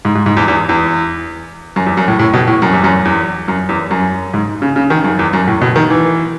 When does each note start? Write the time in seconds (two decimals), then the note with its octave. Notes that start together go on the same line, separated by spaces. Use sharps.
0.05 G#2
0.15 G#2
0.26 G#2
0.37 E2
0.48 E2
0.69 E2
1.76 F#2
1.86 E2
1.97 F#2
2.08 A2
2.19 A2
2.34 B2
2.47 A2
2.62 F#2
2.73 E2
2.84 F#2
3.05 E2
3.48 F#2
3.69 E2
3.91 F#2
4.34 G#2
4.62 C#3
4.76 C#3
4.90 D#3
5.04 F#2
5.19 E2
5.33 F#2
5.47 A2
5.62 B2
5.76 D#3
5.90 E3